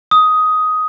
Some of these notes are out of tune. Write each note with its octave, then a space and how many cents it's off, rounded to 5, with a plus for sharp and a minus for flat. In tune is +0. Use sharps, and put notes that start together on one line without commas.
D#6 +10